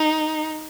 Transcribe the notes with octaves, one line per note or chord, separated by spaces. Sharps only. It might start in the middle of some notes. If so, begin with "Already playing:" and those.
Already playing: D#4